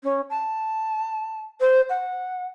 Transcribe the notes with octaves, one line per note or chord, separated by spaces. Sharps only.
C#4
A5
C5
F#5